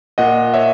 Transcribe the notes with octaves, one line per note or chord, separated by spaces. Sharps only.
A#2 D#5 F#5
C#5 E5